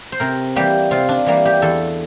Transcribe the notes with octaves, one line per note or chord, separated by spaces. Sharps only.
C5
C3 A#4
E3 G3 A#3 G4
C3 F4
D4
E3 G3 A#3
G4
E2 A4